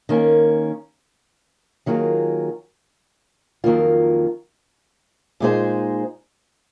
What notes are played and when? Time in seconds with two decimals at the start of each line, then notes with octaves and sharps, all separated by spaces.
0.09 D#3 A#3 C#4
1.86 D#3 F#3 A#3 F4 G#4
3.64 F2 D#3 F#3 A#3 F4
5.40 A#2 G#3 D#4 G#4 C5